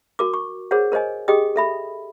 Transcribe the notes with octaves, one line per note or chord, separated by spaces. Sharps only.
F#4 A#4 D6
C#6
G#4 A#4 C5 C#5 F#5
A#4 C5 C#5 D#5 G#5
G4 G#4 D#5 G5 D#6
A4 E5 B5